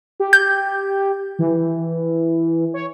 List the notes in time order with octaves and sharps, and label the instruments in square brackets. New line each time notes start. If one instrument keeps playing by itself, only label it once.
[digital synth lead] G4
[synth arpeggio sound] G6
[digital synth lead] E3
C#5